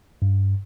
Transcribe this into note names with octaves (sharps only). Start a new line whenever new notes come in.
G2